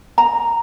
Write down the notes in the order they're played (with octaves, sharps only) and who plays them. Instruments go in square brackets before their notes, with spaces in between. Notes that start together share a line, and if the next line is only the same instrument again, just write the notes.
[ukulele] A#5